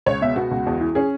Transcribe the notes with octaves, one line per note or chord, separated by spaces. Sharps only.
C#2 C#5
B2 E5
B3 F#4
C#2
E2
E3
C#4 G#4